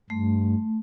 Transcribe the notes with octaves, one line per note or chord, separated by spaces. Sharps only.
G2 A3